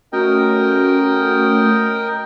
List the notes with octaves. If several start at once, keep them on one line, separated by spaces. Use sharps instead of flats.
A3 C#4 F#4 A#4 D#5 G5